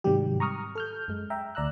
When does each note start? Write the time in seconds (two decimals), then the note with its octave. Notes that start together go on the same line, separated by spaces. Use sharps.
0.04 G#2 C3 D#3 F#3 G3 G4
0.40 A#5 C#6 D#6 F6
0.75 A4 F6 G6
1.08 F#2 G#3
1.30 E5 G5 A#5
1.55 D2 D5 A#5 E6 F#6